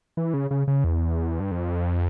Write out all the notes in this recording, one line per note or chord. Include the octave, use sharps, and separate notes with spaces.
E3
C#3
C#3
C#3
E2
G2
F2